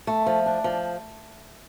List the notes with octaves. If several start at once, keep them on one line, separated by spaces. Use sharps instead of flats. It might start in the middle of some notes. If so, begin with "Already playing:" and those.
A3
F3
D4
F3